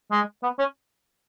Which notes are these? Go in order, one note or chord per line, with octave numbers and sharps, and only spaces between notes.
G#3
B3
C#4